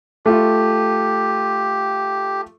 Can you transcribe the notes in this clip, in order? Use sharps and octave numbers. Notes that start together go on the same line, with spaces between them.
A3 F4 G4